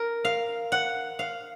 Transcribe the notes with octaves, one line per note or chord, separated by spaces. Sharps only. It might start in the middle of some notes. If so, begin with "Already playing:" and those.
Already playing: A#4
F5
F#5
F5